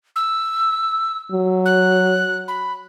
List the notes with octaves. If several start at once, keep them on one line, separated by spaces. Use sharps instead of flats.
E6
F#3
F#6
B5